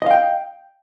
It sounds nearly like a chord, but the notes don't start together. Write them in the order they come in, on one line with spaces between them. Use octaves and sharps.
D#5 F5 G5